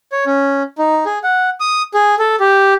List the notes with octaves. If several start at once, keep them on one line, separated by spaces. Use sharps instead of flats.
C#5
C#4
D#4
G#4
F#5
D#6
G#4
A4
G4